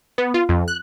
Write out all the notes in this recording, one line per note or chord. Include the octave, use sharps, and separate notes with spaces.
B3
F4
F2
F#6